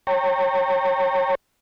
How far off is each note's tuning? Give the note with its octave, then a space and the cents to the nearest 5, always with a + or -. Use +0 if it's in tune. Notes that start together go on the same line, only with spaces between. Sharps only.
C#5 -20 G5 +0 A#5 -35